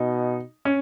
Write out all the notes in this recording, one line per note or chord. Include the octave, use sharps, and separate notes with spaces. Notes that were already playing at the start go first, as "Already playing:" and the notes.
Already playing: B2 D#4
C#4